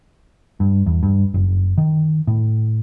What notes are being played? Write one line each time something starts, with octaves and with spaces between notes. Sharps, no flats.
G2
E2
G2
F#1
D#3
A2